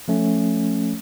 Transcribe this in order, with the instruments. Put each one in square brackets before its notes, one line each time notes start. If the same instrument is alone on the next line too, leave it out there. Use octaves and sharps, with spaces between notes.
[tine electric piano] F3 A3 C#4